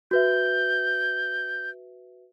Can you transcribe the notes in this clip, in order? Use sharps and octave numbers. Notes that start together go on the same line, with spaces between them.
F#4 B4 E5 G6